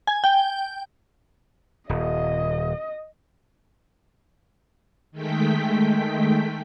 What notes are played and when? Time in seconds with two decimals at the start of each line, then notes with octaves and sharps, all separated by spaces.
0.07 G#5
0.24 G5
1.89 D#1 D#5
5.12 D#3 G#3 A3 G5 B6